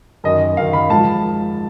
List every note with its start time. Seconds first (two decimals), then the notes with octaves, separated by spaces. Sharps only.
0.24 F#2 D#3 D#5
0.57 F#2 D#3 F5
0.73 B5
0.90 G#2 F3 A5